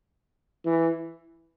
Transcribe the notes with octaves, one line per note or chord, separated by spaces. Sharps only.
E3